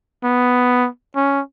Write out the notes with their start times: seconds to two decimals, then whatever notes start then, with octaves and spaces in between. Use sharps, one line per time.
0.24 B3
1.15 C#4